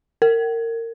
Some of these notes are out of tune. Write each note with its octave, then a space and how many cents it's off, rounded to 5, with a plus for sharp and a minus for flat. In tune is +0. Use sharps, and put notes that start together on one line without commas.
A#4 -25